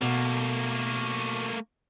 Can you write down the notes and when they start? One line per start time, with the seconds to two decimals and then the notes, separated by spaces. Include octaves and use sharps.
0.02 B2 A3 A#3